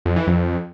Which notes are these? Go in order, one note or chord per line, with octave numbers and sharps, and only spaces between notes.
F2
E3
F2